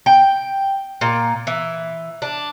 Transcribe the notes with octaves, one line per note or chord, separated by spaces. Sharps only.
G5
A#2
E3
D4